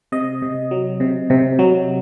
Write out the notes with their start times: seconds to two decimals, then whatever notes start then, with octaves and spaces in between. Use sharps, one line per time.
0.12 C3 D#5
0.42 C3
0.71 F#3
1.00 C3
1.30 C3
1.59 F#3